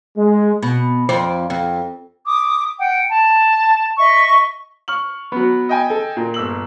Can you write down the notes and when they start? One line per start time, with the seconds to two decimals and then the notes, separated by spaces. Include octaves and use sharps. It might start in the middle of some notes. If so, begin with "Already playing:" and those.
0.16 G#3
0.62 B2
1.09 F2 C5 D5
1.50 F2
2.26 D6 D#6
2.79 F#5 G5
3.10 A5
3.98 D#5 E5 C#6
4.88 C#6 F6 F#7
5.32 F#3 B3
5.69 D#5 G5 G#5
5.90 A4
6.17 A#2
6.34 G1 E6 F#7